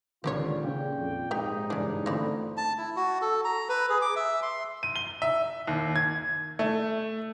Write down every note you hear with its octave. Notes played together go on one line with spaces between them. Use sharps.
C#2 A#2 D3 D#3 C4 F4 G4 C#5
A#2 C#3 G5
F2
G#2 D#4 G4 G5
G2 C#3 E3 C#4 D4
D3 E3 A3 C4 F4 D5 B5
A5
E4
F#4
A4
A#5
B4
G#4
D6
E5
C6
D#7
G7
E5
D#2
G#6
A3